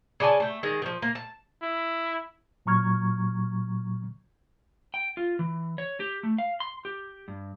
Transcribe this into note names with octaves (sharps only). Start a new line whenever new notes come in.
C#3 D5 G#5 A5
A3 G5
D#3 G#3
D#3 F3
A#3
A5
E4
A#2 F#3 A#5 C#6 F6 G#6
G5
F4
E3
C#5
G4
A3
F5
C6
G4
G2